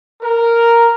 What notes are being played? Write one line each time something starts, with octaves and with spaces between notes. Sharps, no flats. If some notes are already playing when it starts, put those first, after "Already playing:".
A#4